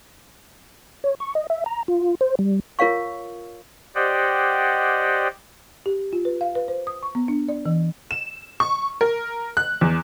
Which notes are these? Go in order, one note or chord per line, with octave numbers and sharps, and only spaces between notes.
C#5
C#6
D#5
E5
A#5
F4
C5
G3
F4 A#4 C#5 F5 C#6
G4 C5 D5 D#5 F#5 G5
G4
F4
B4
F5
B4
C5
D#6
C#6
B3
D4
D5
E3
E7
C#6
A#4
F#6
E2